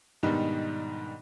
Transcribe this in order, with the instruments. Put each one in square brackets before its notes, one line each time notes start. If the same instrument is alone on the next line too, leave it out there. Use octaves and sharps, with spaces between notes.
[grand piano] G#2 B2 D#3 G3 D4 D#4